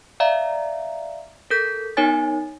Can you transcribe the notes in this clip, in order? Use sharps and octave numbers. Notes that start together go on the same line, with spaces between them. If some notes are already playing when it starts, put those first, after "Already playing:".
D5 E5 F5 A#5
A4 A#4 G6 B6
B3 D#4 A#4 C#5 G#5 A6